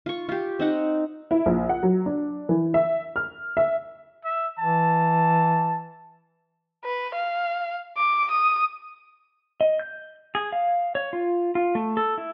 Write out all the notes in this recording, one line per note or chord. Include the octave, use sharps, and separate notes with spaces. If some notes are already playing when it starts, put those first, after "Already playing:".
F4 C#6
F4 G4
C4 D#4 F#5
E4
A#1
F#5
F#3
D4
E3
E5
F6
E5
E5
E3 A5
B4
F5
D6
D#6
D#5
G6
G#4
F5
C#5
F4
F4
A3
A4
E4